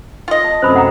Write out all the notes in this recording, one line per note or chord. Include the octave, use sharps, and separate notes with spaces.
F4 D#5
A5
F#2 C3 A3 C5 B5 D#6
F#5 G5 A#5